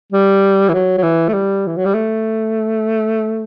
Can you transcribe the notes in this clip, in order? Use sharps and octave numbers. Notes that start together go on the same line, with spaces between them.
G3
E3
F#3
F#3
E3
A3
G3
E3
F#3
G3
A3